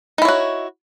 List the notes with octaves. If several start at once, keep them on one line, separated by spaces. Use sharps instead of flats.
D#4 E4 F#4 C#5